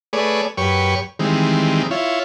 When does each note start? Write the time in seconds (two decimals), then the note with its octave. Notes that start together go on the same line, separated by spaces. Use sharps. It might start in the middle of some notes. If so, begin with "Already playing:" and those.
0.13 A3 G#4 B4 C#5 D5
0.58 F#2 G4 B4 C#5 C#6
1.19 D#3 E3 G3 G#3 C4
1.91 E4 F4 C#5